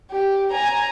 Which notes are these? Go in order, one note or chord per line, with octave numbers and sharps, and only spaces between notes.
G4
G#5 A#5